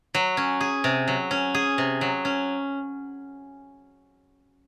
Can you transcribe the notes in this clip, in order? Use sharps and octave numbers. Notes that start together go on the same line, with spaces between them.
F#3
C#4
G#4
C3
F#3
C#4
G#4
C3
F#3
C#4